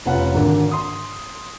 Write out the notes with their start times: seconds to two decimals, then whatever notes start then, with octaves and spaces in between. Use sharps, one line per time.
0.05 F1 C#4 F4 B4 F#5
0.35 G#1 D3
0.72 C6 D#6